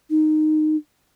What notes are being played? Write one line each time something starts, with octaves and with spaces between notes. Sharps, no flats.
D#4